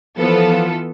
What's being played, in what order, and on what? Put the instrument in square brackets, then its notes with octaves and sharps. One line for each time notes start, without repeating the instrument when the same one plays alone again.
[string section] E3 B3 F4 A4 [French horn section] F3